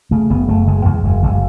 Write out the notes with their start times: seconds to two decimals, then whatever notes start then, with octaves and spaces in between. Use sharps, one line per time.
0.11 C#3 A3
0.30 F#1 B3
0.48 F#1 A3
0.67 F#1 G#3
0.85 E2 G#3
1.04 F#1 G#3
1.23 F#1 G#3